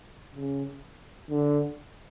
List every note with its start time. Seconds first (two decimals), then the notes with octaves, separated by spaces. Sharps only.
0.35 C#3
1.30 D3